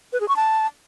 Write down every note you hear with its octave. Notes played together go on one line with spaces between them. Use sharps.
B4
G#4
C#6
A5